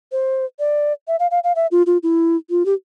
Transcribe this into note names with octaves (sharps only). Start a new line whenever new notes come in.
C5
D5
E5
F5
F5
F5
E5
F4
F4
E4
F4
G4